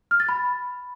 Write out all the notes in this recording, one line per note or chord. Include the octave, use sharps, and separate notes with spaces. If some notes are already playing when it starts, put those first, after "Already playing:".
F6
A6
B5